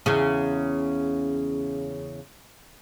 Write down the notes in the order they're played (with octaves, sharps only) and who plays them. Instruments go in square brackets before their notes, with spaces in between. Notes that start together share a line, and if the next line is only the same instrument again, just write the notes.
[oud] E2 C#3